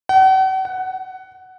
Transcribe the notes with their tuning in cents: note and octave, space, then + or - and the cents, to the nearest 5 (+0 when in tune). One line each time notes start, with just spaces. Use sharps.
F#5 +45
F#5 +10